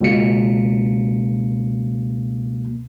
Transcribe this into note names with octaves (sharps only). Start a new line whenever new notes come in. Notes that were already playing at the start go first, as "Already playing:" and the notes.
C#2 B2 A#3 C#7